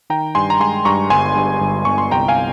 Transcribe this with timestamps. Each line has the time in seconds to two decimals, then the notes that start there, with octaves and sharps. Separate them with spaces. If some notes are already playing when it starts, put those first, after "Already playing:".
0.10 D#3 G5 A#5
0.35 G2 G#5 C6
0.50 A#5
0.60 G#3 G#5 C6
0.85 G2 A#5 C#6
1.10 G1 G#5 C6
1.36 G2
1.61 G1
1.85 G1 C#6
1.98 C6
2.11 C2 G5 A#5
2.28 F5 G#5